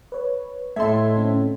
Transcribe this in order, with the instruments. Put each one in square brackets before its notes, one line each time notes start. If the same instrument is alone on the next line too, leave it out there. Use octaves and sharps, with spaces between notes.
[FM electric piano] B4 C#5
[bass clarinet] A2 [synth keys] A3 A4 [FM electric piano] D#5 G#6 [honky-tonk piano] E5 C6
[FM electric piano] D3 C4 C#4